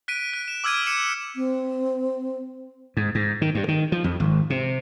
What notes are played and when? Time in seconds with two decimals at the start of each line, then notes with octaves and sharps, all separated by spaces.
0.08 F#6 B6 D7 D#7
0.33 F#6
0.48 E7
0.64 D6 E6 F6 G#6 D7 D#7
0.87 C#7 E7
1.36 C4
2.97 G#2
3.15 G#2
3.42 D#3
3.55 G2
3.68 D#3
3.92 F3
4.04 F2
4.20 G#1
4.50 C3